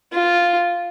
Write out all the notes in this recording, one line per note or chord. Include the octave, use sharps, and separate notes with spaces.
F4